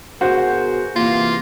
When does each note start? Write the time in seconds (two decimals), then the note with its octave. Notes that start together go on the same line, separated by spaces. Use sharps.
0.21 B2 F#4 G#4 A#4 C5
0.96 C3 E3 A#3 F4